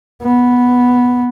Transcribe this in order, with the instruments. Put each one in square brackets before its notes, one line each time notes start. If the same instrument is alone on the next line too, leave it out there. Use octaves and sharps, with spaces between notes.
[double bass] B3